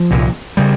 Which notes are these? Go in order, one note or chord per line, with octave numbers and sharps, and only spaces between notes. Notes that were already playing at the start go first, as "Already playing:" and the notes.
Already playing: F3
C2 A#2
C#3 G3